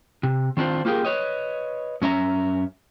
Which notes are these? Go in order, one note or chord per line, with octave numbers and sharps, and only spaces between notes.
C3
D#3 C4 D4 F4 C5
A#3 F4 G4 G#4 A#4
B4 C#5 D#5
F#2 C#4 E5 A#5